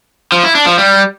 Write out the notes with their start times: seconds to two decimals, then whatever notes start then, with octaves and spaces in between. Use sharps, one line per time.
0.32 F3
0.43 E4
0.55 D4
0.66 F3
0.78 G3